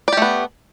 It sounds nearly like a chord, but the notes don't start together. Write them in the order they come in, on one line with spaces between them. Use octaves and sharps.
D5 G4 A3 B3